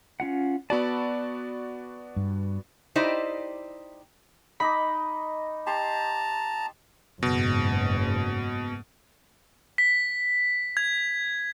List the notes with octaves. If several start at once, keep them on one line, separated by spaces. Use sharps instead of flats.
C#4 F4 F#5
B3 F#4 D5 A5 B5 E6
G2
D#4 E4 G4 C5 D5 D#5
D#4 D#5 B5 D6
G4 A5 A#5 C6
F#1 G#2 B2
B6
G#6